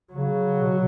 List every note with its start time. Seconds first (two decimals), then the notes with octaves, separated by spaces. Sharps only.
0.13 C#3 F#3
0.61 B2